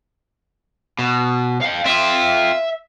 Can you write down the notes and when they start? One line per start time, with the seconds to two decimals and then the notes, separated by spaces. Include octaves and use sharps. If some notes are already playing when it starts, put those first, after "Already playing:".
0.99 B2
1.61 F5 G5
1.86 C4 F4 E5